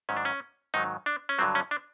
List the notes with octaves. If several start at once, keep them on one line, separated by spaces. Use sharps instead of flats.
G#2 D#3 F#3 C#4
D4
C#4
G#2 D#3 F#3 D#4
D4
C#4
G2 D3 F#3 C4
C#4
D4